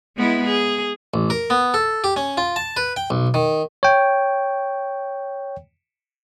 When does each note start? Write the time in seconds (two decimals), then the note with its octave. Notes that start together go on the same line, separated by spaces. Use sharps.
0.17 G#3 B3 E4
0.45 G#4
1.14 A1
1.30 A#4
1.50 B3
1.74 A4
2.04 G4
2.16 C#4
2.37 F4
2.56 A5
2.77 B4
2.96 G5
3.10 B1
3.34 D#3
3.83 C#5 G5